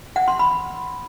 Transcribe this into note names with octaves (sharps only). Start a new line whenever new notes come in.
F#5
C6
B5